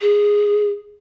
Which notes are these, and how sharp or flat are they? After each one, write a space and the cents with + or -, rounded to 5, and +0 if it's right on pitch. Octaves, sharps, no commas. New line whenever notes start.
G#4 -5